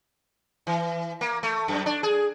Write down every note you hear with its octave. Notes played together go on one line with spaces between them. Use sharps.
E3
A#3
A3
F#2
D4
G#4